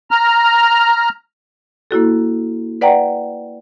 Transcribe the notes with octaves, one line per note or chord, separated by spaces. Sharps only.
A#5 F6
A#3 E4 F#4 A4
B4 D5 F#5 G5 A#5